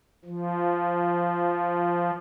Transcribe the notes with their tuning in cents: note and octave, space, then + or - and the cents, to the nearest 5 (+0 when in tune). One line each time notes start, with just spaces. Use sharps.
F3 -10